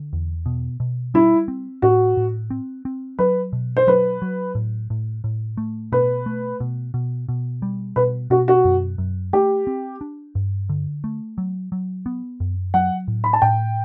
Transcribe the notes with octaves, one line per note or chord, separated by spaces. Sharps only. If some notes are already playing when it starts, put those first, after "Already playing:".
Already playing: D3
E2
B2
B2
G3 E4
C4
A2 F#4
A2
C4
C4
F#3 B4
B2
C5
F#3 B4
F#3
A2
A2
A2
A3
B2 B4
A3
B2
B2
B2
G3
B2 B4
B2 F#4
F#4
F#2
F#2
A3 G4
C4
D4
G2
D3
A3
F#3
F#3
B3
F#2
F#3 F#5
A2
B5
A5
A2 G5